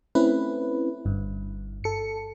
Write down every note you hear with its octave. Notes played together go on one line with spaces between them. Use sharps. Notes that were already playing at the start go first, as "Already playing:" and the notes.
A3 C4 C#4 E4 B4
G1 G2
A4 C#7